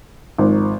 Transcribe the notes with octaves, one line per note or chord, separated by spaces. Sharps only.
G#1 G#2 F3